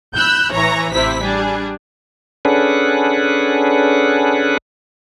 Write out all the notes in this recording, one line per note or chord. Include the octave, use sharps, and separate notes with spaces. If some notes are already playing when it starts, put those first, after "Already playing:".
B5 E6 F#6 G6
A1 E3 C#5 A#5
A1 C3 E4 C5 B6
G3 D4 G#4
C#4 D4 G#4 A4 B4 F#5